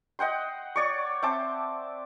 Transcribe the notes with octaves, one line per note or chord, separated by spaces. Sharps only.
D#5 F#5 G5 C6
C#5 D5 C#6
C4 E5 A5 D6